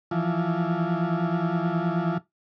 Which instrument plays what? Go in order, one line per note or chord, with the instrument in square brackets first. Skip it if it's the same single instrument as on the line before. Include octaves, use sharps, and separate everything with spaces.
[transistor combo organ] E3 F3